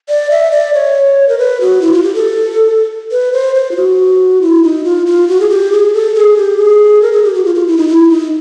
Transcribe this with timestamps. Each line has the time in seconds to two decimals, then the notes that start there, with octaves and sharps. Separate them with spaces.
0.09 D5
0.31 E5
0.51 D5
0.74 C#5
1.29 A#4
1.38 B4
1.61 F#4
1.81 E4
1.93 F4
2.03 G4
2.15 A4
3.12 B4
3.33 C5
3.55 C5
3.71 F4
3.76 F#4
4.41 E4
4.63 D#4
4.84 F4
5.06 F4
5.28 F#4
5.40 G#4
5.50 G4
5.72 G#4
5.94 A4
6.15 G#4
6.36 G4
6.58 G#4
7.02 A#4
7.12 G#4
7.24 G4
7.34 F#4
7.45 F4
7.55 F4
7.67 E4
7.77 D#4
7.88 E4
8.10 D#4